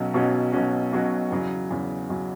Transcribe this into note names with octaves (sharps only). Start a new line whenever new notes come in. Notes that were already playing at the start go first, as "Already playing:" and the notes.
Already playing: B1 B2 F#3 C#4 F#4
B1 B2 F#3 C#4 F#4
B1 B2 F#3 C#4 F#4
B1 B2 F#3 C#4 F#4
E2 C#3 F#3
E2 C#3 F#3
C#3 F#3